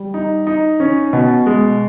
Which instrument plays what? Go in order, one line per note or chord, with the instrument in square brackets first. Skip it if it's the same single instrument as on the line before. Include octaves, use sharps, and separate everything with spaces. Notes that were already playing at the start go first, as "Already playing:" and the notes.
Already playing: [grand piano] G3
D#4
D#4
C#4
B2
G#3